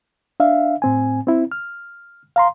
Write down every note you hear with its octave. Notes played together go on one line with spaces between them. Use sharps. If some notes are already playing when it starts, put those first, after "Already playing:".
D4 E5 F5
A2 C4 G#5
C4 E4
F6
F5 A#5 C6